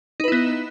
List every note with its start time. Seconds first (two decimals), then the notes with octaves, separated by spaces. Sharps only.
0.20 D#4
0.24 B4
0.28 E4
0.32 B3